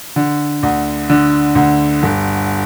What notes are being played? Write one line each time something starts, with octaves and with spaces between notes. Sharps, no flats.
D3
D2
D3
D2
G1